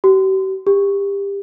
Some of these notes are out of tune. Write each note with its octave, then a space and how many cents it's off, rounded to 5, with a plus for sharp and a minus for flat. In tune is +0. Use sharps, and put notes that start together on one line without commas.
G4 -45
G4 +25